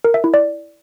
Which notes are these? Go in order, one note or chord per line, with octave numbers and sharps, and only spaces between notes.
A#4
E5
E4
D5